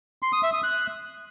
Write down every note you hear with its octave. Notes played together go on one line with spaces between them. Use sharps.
C6
D#6
E5
D#6
F#6